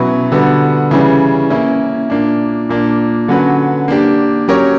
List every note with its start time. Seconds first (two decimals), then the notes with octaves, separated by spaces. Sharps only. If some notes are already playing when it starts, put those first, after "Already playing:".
Already playing: B2 F#3 C#4 E4 B4
0.32 D3 G3 B3 F#4
0.91 C#3 E3 G3 C#4
1.50 A#3 C#4 E4
2.10 A#2 A#3 D4
2.69 A#2 A#3 D4
3.28 D3 F#3 C#4 F#4 B4
3.88 A#3 D4 G4
4.48 F#3 C#4 G4 A#4 C#5